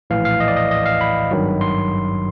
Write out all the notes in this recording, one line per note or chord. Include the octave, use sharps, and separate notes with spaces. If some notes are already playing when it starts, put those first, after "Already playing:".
A#1 A2 E3 F5
F5
D#5
D5
D#5
D#5
F5
B5
G#1 G2 D#3 F#3
C6